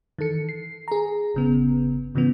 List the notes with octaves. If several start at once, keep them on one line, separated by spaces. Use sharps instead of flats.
D#3 E3 A4 C#7
C7
G#4 A#5
G1 C#3 B3
G#2 C#3 E3 F3 B3